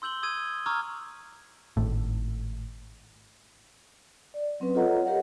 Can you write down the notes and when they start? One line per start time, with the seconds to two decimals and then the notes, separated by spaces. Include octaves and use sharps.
0.02 C6 E6 G6 F#7 G7
0.23 D#6 E6 G#6 D#7
0.66 A#5 C#6 D6 E6 F6 G#6
1.77 G#1 A2
4.34 D5
4.60 F#3 C4 C#4 B4
4.75 F4 A4 C#5 D#5 F#5 A#5
5.05 G4 A#4 C#5 D#5 F5 F#5